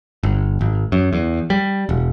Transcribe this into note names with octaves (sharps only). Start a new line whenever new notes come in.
G1
G#1
F#2
E2
G3
E1